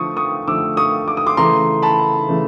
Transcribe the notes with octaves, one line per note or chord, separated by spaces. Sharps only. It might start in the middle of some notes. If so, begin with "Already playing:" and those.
Already playing: D3 F3 A3 C#6 D#6
C#6 D#6
D3 F3 A3 D6 E6
C#6 D#6
D6
D#6
C6 D6
C#3 E3 A3 A#5 C6
A5 B5
C#3 E3 A3